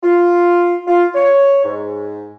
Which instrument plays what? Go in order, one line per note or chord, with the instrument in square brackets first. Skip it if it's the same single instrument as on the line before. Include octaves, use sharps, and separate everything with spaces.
[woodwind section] F4
F4
C#5
G#2